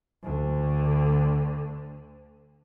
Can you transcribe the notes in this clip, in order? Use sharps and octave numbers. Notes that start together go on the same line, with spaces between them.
D2 D3